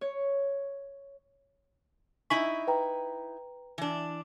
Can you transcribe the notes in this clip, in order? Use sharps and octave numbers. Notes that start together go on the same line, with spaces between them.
C#5
D#4 E4 G#5 C#6 B6 F#7
B4 G5 A#5
E3 D4